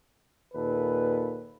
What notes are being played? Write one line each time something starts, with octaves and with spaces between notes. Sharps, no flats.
D#2 A#2 A4 B4